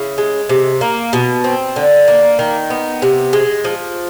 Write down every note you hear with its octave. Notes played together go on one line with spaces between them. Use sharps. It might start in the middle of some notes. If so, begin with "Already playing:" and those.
Already playing: C#3 E4
G#3
C3
A#3
B2
C4
D3
A#3
D#3
B3
C3
G#3
F3